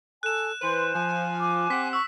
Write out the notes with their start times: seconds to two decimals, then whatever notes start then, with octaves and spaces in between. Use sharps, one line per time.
0.23 A4 G#5 F#6 E7
0.62 E3 B4 C5 C6
0.93 F3 G#5
1.40 D6
1.70 C4 G4 F#5 B6
1.93 C#6 E6